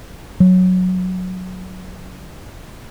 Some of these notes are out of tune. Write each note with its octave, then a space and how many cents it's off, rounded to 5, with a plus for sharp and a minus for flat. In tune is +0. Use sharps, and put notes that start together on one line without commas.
F#3 -10